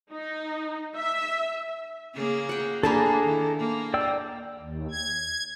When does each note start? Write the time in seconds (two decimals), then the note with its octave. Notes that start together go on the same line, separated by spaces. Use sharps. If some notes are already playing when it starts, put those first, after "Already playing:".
0.12 D#4
0.95 E5
2.15 C#3 A#3 G#4
2.49 F#5 G5
2.83 A#3 D4 G#4 A4 B4 A5 A#5
3.24 D#3 E4
3.59 A#3
3.94 D5 G5 E6
4.59 D#2
4.91 G#6